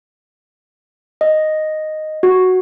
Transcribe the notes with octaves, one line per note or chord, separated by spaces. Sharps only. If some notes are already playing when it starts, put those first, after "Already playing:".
D#5
F#4